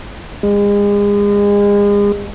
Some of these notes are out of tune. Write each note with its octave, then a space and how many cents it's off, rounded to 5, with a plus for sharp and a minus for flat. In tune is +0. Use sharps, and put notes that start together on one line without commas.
G#3 -35